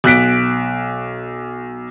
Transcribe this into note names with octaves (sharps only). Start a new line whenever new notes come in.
B1 F#6 B6 D7